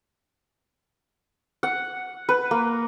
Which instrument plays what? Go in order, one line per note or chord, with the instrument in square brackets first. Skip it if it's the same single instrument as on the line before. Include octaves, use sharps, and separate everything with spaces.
[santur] F#5
B4
A#3